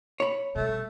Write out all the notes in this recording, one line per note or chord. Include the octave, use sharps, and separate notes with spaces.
C#5 B5
B2 G3 A3